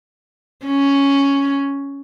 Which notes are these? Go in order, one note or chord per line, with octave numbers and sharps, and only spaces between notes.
C#4